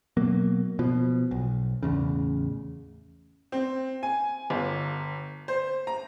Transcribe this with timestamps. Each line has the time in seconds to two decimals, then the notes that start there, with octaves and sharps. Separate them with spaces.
0.17 B2 F#3 A#3
0.79 B2 F3
1.31 B1
1.83 A1 E2 C#3
3.52 C4
4.03 G#5
4.50 G1
5.48 C5
5.87 A#5